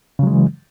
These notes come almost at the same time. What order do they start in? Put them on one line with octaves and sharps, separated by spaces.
C#3 F#3 G#3 E3